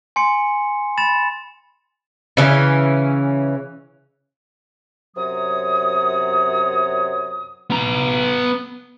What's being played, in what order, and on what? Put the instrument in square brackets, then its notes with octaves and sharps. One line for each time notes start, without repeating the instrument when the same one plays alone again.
[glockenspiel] G#5 C6 C#7
B5 A6 E7
[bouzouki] C#3 E3 C#4
[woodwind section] F#2 C3 F#3 D#6
[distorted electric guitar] B3 A#5